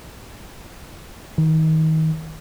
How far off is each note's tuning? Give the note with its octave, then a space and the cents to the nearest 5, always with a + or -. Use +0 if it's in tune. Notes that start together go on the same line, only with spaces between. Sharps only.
D#3 +30